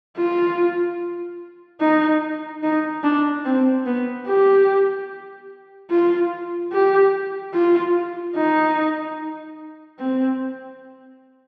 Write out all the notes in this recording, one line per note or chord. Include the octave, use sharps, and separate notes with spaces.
F4
D#4
D#4
D4
C4
B3
G4
F4
G4
F4
D#4
C4